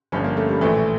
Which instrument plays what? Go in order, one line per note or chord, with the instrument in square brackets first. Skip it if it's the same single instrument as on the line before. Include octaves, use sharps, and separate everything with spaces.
[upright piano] G1 G2 D3 F3 C#4
A#3
A3
G3
A#1 A2 E3 A3